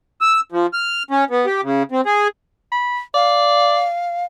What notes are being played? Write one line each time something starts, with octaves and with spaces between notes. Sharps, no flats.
E6
F3
F6
C#4
B3
G4
C#3
C4
G#4
B5
D5 F5